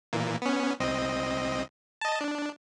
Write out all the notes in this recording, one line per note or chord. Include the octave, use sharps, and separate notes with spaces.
A#2 E3 A#3
B3 C#4
C2 C4 D#5
D#5 A5
D4